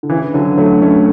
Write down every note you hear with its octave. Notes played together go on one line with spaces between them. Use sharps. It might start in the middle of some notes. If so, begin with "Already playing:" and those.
D3
C#3 E3
D3 F#3
F#3 A3
A3 C#4